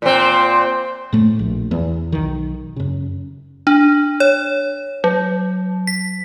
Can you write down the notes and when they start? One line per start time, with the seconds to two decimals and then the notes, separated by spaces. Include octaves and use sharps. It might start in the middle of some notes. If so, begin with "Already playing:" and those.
0.02 A#2 C4
1.13 A2 A3
1.39 A#1
1.71 E2
2.12 B1 D#3
2.76 F#2 C#3
3.67 D4
4.20 C#5
5.04 F#3
5.87 B6